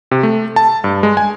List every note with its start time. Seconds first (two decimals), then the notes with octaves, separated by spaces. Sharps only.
0.11 C3
0.23 A3
0.56 A5
0.84 G2
1.03 G#3
1.17 G#5